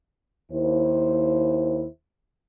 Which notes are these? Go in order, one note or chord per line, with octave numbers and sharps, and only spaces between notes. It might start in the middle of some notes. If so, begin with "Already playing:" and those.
D#2 E4 C5